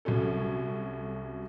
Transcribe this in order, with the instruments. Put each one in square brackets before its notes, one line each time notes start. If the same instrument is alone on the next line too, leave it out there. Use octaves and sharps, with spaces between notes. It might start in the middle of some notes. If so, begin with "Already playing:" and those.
[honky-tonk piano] C2 F#3 C#4 A4